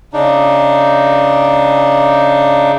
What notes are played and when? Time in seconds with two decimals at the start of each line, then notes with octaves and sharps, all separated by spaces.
0.13 C#3 D4 D#4